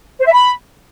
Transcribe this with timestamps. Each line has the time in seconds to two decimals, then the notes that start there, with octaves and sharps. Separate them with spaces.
0.19 C5
0.26 E5
0.32 B5